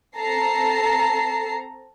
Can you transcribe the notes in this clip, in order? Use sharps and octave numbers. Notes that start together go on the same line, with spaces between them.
C4 A4 A5 A#5 C7